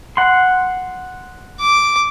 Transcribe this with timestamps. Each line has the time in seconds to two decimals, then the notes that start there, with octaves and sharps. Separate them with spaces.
0.17 F#5 C6
1.61 D6